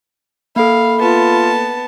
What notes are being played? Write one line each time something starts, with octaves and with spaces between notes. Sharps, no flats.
A#3 A4 F5 B5
B3 F4 A5